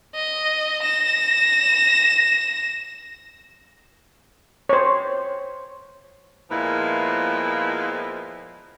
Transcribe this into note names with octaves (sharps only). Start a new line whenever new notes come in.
D#5
A#6 E7
C5 C#5
A#2 F3 G#3 B3 E4